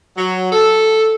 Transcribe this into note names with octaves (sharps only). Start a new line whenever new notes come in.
F#3
A4